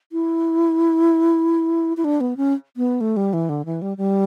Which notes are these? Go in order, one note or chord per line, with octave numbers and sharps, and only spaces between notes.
E4
E4
D4
B3
C#4
B3
A3
G3
E3
D3
E3
G3
G3